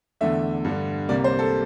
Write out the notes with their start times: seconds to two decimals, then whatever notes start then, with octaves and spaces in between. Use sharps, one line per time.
0.21 E2 D3 A3 E5
0.65 G2 D3 G3
1.09 C2 C3 G3 A#3 D5
1.24 C5
1.39 A4